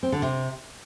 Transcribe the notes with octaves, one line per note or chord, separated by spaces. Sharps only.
C4
D3
C3